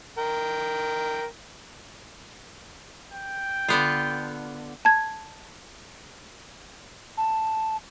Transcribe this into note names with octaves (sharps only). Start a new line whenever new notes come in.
A#4 G5
G5
D3 B3 F4
A5 G#6
A5